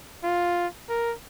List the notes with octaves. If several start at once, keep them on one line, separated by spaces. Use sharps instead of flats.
F4
A#4